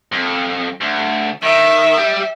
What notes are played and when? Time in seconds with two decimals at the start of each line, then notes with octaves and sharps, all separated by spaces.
0.12 F2
0.81 D2
1.43 D#3 E5
1.97 G3 G4